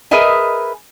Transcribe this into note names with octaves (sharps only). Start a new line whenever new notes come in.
G#4 A#4 B4 D#5 E5 G#5